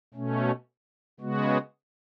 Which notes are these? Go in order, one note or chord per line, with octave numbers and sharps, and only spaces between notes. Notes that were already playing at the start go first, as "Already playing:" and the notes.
B2 A3 C#4
C#3 G#3 B3 F#4